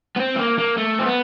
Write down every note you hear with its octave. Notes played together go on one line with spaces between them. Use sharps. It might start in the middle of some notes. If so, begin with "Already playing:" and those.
B3
C4
A3
A#3
A#3
A3
C4
B3